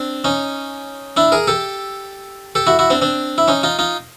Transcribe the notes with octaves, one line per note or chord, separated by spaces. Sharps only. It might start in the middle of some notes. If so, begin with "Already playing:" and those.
Already playing: C4 D4
C#4 D#4
D4 E4
G#4 A#4
G4 A4
G4 A4
E4 F#4
E4 F#4
C4 D4
C4 D4
E4
C#4 D#4
D#4 F4
D#4 F4